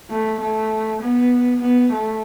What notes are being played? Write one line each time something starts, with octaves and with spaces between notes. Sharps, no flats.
A3
A3
B3
B3
A3